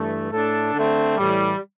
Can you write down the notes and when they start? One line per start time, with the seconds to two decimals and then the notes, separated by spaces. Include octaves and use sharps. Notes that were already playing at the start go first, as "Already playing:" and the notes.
Already playing: G2 E3 A3
0.32 A2 A3 D4 A4
0.73 D3 A3 C4
1.16 A2 E3 G3